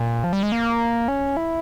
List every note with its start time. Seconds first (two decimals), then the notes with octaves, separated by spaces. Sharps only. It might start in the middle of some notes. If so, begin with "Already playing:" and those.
Already playing: A#2
0.24 F3
0.33 G3
0.43 G#3
0.52 A#3
1.08 C#4
1.37 E4